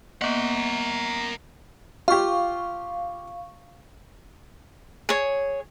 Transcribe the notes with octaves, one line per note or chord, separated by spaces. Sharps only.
A#3 B3 A#4 F#5
F4 G4 F5 C#6
G#4 C#5